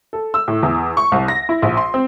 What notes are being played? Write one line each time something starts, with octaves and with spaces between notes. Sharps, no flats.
A4
E6
A2
E2
C#6
C2
A#6
E4
A#1
C6
C4